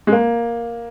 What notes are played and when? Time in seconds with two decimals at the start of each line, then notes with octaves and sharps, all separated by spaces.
0.07 G#3
0.12 A#3